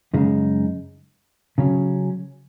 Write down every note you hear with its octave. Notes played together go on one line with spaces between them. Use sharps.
F#2 C#3 G#3 D#4
C#3 F#3 C#4